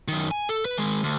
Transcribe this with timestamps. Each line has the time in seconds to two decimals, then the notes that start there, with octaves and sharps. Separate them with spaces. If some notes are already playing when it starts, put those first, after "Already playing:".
0.08 F#2 D#3
0.31 G#5
0.49 A4
0.65 B4
0.77 D#3 G#3
1.03 D2